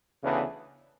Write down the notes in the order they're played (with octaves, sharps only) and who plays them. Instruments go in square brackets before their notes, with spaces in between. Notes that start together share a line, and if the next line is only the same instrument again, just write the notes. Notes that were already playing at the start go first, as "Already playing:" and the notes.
[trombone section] D2 C#3 E3 B3 D4